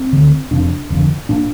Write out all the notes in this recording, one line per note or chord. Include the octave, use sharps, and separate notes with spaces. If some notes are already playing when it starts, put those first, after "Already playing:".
Already playing: C4
D2 D3
F1 F2 C3 D4
F1 F2 D3
A#2 D4